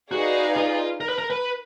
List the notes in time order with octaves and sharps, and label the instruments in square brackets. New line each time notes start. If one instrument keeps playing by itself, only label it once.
[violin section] D#4 G#4 B4 D5 F5 [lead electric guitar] F#4
[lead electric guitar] F4
A#4
B4
A#4
B4